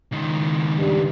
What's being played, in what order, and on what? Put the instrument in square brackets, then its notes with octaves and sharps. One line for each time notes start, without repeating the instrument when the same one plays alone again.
[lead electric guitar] C#2 D#3
[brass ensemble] G2